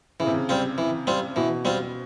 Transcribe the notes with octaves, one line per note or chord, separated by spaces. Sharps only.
C#3 E3
C3
C#3
G3 C4 F4
E3
G3 C4 F4
B2 E3
G3 C4 F4